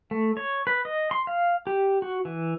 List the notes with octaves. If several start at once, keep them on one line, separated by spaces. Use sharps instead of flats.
A3
C#5
B4
D#5
C6
F5
G4
F#4
E3